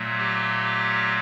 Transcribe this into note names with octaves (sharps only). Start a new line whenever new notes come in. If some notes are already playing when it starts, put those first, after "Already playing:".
Already playing: A#2 F#3 A3
G4